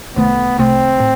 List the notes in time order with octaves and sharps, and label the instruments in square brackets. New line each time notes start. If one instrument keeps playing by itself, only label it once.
[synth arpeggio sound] C2 C3 D#3 A3 [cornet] B3
[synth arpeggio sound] C2 C3 D#3 A3 [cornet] C4
[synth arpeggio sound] A2